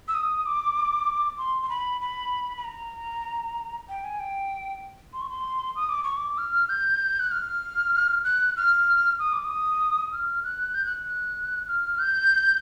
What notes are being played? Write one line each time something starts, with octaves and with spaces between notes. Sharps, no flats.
E6
D#6
D6
C6
C6
B5
B5
B5
A#5
G5
G#5
G5
C6
C#6
C6
D#6
D6
C#6
D6
F6
G6
F#6
F6
F#6
F6
D#6
D6
D#6
F6
F#6
G6
F#6
F#6
F6
G6